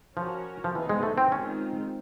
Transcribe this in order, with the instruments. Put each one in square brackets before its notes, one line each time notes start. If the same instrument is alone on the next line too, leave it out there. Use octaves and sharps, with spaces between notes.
[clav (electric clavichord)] F3 [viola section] C#4 F#4 A#4 C#5
[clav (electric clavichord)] F3
[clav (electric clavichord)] E3 [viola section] B3 D#4 G#4 C5
[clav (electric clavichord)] G#3
A3
C4
[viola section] D#3 G#3 C4 F4 [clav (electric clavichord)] C#4